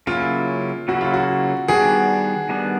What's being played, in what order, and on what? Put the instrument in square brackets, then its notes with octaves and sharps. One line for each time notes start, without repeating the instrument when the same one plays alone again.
[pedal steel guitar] C#3 F#3 A#3 C#4 E4 [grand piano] F4
[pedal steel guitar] C#3 F#3 A#3 C#4 E4 [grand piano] F#4
[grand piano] F4
F#4
[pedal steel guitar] D#3 G3 B3 D4 [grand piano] F#4 G#4
[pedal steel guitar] D#3 G3 B3 D4